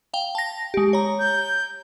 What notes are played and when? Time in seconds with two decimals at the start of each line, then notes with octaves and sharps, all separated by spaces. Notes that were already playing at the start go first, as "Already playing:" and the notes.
0.14 F5 G5
0.35 A5 A#6
0.74 G#3 G4
0.93 C#5 A#5
1.20 G6